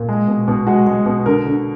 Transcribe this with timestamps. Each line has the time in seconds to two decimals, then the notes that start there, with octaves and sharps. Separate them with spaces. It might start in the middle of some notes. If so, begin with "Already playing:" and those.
Already playing: A#2
0.09 G#3
0.28 B2
0.48 B2
0.67 G#3 F#4
0.87 G#3
1.06 B2
1.26 D3 A#4
1.46 D3